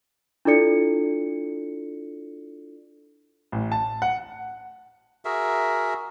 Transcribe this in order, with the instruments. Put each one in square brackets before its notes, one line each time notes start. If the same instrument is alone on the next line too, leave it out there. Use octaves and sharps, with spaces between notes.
[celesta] D4 E4 F4 A4 D5 C#7
[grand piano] A1
A5
F#5
[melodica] F#4 G#4 A#4 E5